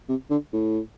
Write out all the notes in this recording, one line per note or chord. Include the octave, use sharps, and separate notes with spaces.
C3
D3
A2